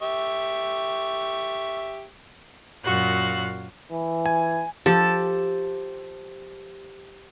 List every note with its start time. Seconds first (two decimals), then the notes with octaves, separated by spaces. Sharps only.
0.02 G4 E5 C#6
2.84 F#2 A#2 F#4 F5 F#6
3.92 E3
4.26 G#5
4.86 F3 G4 A4